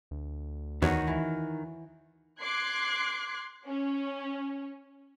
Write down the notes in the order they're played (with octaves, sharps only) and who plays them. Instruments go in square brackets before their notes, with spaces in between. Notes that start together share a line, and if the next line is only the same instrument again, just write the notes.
[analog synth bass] D2
[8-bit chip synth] E2 [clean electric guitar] D#3 [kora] F#4 C#5 D#5
[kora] E3
[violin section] C6 D6 F#6 G#6 C7
C#4